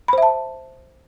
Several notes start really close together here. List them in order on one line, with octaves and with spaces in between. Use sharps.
B5 C5 E5 A5